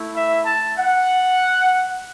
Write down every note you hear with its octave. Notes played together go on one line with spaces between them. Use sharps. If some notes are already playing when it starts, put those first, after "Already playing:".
Already playing: A3 E4
E5
A5
F#5